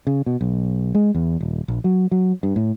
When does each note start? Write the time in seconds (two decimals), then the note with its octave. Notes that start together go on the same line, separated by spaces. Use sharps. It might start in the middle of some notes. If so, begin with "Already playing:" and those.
0.07 C#3
0.26 B2
0.41 B1
0.95 G#3
1.15 E2
1.41 D#1
1.68 A#1
1.84 F#3
2.11 F#3
2.43 G2
2.56 A2